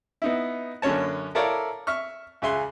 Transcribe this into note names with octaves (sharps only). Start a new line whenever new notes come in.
B3 D#4 E4
F#2 D3 A#3 C#4 C#5 A5
E4 A4 A#4 C#5 D5 F5
E5 C#6 F6
C#2 C#3 E5 G#5 C6 F#6